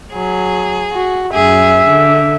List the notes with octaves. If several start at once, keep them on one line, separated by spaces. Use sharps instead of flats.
F#3 G#4
F#4
F#2 G#4 E5
D3